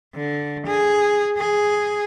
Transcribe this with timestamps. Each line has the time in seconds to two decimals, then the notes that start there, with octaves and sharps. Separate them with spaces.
0.15 D3
0.66 G#4
1.38 G#4